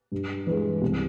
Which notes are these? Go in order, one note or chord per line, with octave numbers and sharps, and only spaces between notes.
G2
E3 G#3
C2